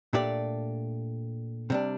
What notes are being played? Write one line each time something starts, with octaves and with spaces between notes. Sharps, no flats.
A#2 A3 D4 G4 D5
C3 G3 D4